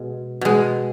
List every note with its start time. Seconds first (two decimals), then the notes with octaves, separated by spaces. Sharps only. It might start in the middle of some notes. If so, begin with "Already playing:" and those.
Already playing: B2 G#3
0.41 B2 G#3